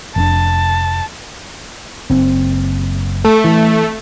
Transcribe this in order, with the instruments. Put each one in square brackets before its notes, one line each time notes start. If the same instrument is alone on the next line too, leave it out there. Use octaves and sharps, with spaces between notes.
[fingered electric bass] F1 B2 D4 [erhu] A5
[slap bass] F#1 [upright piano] C4
[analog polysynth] A3 [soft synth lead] A4
[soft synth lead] E3